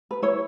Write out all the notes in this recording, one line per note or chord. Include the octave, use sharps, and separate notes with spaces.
B4
E4 C#5